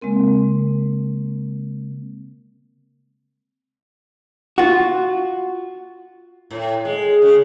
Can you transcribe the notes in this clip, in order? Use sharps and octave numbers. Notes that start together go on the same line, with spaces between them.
C#3 G#3 A#3 C4 A#4
F4 F#4
A2
G#3
C#3